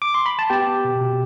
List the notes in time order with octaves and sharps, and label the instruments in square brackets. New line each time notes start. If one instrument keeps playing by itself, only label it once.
[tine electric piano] D6
C6
B5
A5
B3 G4 G5
B3
B2
B2